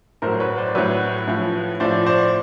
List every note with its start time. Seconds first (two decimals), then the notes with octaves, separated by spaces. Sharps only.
0.22 A2 F#3 A#4 C5
0.40 B4 C#5
0.58 C5 D5
0.75 A2 F#3 B4 C#5
1.28 A2 F3
1.80 A2 F3 C5 D5
2.06 C5 D5